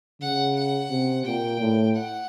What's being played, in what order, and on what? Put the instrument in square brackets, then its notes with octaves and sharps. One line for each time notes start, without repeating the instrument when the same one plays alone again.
[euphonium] C#3 [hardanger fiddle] F#5
[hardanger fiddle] F#5
[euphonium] C3
[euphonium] A#2 [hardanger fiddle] G5
[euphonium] A2
[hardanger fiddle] F#5